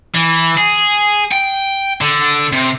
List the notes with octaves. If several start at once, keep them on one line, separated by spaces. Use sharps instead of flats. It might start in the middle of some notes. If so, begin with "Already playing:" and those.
E3
G#4
G5
D3
C3